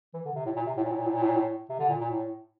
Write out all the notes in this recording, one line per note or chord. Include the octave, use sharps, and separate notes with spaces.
E3
D3
C3
A2
A#2
C3
A2
A#2
A2
A#2
A2
A#2
A2
A#2
A2
C3
D3
A#2
A#2
A2